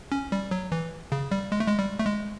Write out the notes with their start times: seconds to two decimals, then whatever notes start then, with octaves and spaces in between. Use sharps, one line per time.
0.12 C#4
0.32 G3
0.51 F#3
0.72 E3
1.12 C#3
1.31 G3
1.52 G#3
1.60 A3
1.68 G#3
1.79 G3
1.99 A3
2.06 G#3